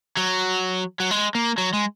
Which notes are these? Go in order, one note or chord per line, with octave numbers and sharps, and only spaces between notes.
F#3
F#3
G#3
A#3
F#3
G#3